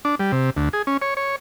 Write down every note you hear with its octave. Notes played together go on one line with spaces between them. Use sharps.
D4
G3
C3
D2
G#4
C#4
C#5
C#5